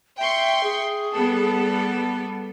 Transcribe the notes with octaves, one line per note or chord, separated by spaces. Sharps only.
E5 G5 C6 C#6
G#4
G3 B3 A4